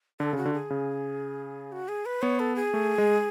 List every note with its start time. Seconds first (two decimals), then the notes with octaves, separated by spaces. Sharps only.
0.20 D3 A4
0.33 C#3
0.37 F#4
0.45 D3
0.54 G#4
0.70 C#3
1.72 F#4
1.88 G#4
2.06 B4
2.22 B3 C#5
2.39 A4
2.56 G#4
2.74 A3
2.98 G#3